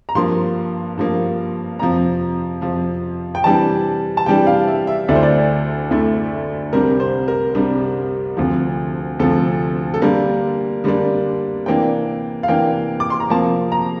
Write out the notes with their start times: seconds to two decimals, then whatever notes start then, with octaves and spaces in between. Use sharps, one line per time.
0.09 A#5
0.15 G2 F3 A#3 C6
0.98 G2 F3 A#3
1.79 F2 C3 F3 A#5
2.61 F2 C3 F3
3.35 G5
3.44 C3 E3 G3 D4 A5
4.17 A5
4.26 C3 E3 G3 D4 G5
4.47 F5
4.67 E5
4.87 E5
5.09 D2 D3 A3 E4 D5
5.15 C5
5.23 D5
5.91 D2 D3 A3 E4
6.73 C2 C3 G3 D4 A#4
7.00 C5
7.28 A#4
7.55 C2 C3 G3 D4
8.37 D2 C3 F3
9.19 D2 C3 F3 A4
9.94 A4
10.02 D3 G3 A#3 D4 A#4
10.84 D3 G3 A#3 D4
11.66 C3 E3 A#3 D4 G5
12.43 F5
12.48 C3 E3 A#3 D4 G5
13.00 D6
13.10 C6
13.20 A#5
13.30 C3 F3 A#3 A5
13.72 A#5